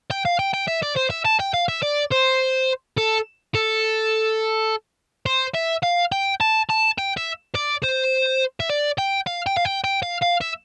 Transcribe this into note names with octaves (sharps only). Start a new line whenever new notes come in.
G5
F5
G5
G5
E5
D5
C5
E5
A5
G5
F5
E5
D5
C5
A4
A4
C5
E5
F5
G5
A5
A5
G5
E5
D5
C5
E5
D5
G5
F5
G5
F5
G5
G5
F5
F5
E5